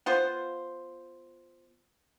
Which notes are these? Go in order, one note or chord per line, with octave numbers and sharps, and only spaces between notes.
B3 F4 C5